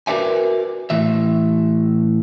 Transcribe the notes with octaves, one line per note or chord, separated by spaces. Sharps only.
F#4 A#4 B4 D5 E5 G#5
A2 E3 E5